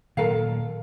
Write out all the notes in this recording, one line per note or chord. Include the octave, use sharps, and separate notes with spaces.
A#2 D#3 F#3 A4 A#4 F5